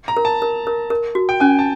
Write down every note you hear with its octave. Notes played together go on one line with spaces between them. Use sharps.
A#5
A#4
A5
A#4
A#4
A#4
F#4
G5
C#4 G#5
A5